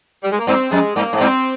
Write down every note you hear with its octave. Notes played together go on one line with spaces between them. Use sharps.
G3
G#3
A#3
G2 C4
F2 G#3
G2 A#3
G#2
G2 C4